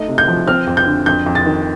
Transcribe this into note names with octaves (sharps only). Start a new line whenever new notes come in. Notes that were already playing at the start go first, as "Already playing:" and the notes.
Already playing: A3 D#4
C3
G6
F3
C4 F6
F2
G6
D3
F2 G6
F2
A6
D#3